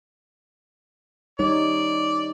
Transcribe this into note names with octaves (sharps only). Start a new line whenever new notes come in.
G3 D#4 C#5 D5